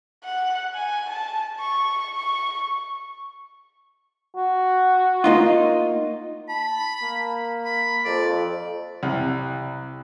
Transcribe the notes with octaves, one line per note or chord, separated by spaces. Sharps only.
F#5
G#5
A5
C#6
C#6
F#4
A#3 D#4 F4
A5 B5
A#3
B5
F2 D5
C2